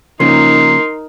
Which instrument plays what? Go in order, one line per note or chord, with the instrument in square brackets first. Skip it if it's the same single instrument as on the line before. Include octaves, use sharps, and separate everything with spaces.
[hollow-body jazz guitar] C#3 F3 A#3 [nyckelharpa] D#4 A#4 [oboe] C6